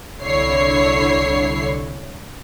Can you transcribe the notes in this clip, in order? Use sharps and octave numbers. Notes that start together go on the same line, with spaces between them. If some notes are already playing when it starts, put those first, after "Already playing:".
C2 D3 E4 C#5 C7